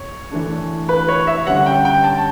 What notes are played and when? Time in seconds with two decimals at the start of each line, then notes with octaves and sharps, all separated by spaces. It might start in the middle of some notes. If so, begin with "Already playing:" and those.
Already playing: C#5
0.31 E3 A3 D4
0.89 B4
1.08 C#5
1.27 E5
1.47 D3 G3 C#4 F#5
1.66 G5
1.85 G5
2.04 A5